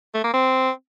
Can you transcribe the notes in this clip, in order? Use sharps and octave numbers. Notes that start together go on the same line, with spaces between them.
A3
A#3
C4